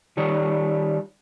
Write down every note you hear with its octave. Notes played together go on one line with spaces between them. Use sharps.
D#3 G3 C#5